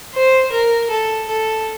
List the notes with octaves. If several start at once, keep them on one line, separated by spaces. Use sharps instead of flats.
C5
A#4
A4
A4